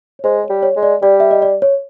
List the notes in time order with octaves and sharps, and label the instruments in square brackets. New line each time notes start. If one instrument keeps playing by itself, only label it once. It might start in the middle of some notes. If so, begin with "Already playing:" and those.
[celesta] C#5
[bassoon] G#3 [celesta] C5
[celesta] C#5
[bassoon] G3
[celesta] C#5
[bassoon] G#3
[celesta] D5
[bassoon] G3 [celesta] D5
[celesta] E5
D#5
D5
C#5